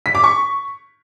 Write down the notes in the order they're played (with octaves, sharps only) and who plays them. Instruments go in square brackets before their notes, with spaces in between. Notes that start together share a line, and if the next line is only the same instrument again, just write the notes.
[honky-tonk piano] B6
D6
C#6